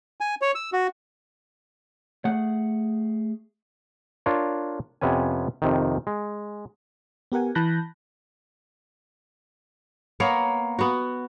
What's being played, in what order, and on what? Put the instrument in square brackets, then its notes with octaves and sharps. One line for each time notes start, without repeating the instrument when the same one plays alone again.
[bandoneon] G#5
C#5
E6
F#4
[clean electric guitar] A3 G#4 F#5
[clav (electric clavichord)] D4 F4 A#4 C#5
F2 C3 B3 C#4 G#5
F2 C3 D#3
G#3
[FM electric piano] B3 G4 A#4 F#5 G#5
E3 A5 B5 F#6 G6 A#6
[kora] A#3 B3 A#4 C#5
B3 F#4